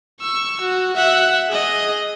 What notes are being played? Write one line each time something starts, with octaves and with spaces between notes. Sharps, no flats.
C#6 E6
F#4
E5 F#5
G#4 D#5